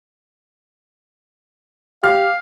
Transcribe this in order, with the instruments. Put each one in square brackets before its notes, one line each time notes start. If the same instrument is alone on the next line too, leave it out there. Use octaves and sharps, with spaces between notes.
[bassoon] G4 [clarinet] F5 [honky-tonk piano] F6